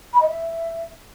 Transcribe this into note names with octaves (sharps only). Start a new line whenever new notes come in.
B5
D#5
E5